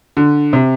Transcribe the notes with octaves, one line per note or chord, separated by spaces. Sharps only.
D3
C3